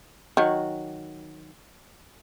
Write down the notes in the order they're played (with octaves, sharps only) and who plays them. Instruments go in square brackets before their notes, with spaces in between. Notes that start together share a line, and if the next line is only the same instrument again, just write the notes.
[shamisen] D#3 F#3